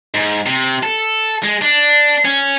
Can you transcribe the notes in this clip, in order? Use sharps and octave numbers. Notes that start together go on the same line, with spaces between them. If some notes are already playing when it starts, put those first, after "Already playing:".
G#2
C3
A4
G#3
D4
C#4